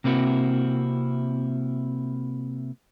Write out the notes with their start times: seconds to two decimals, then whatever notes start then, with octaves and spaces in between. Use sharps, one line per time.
0.04 C3 A#3 C4 E4 F#4